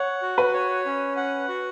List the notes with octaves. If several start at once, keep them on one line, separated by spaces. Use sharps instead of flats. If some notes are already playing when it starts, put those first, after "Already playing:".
Already playing: C#5 F#5
F#4
B4
C#5
C#4
F#5
F#4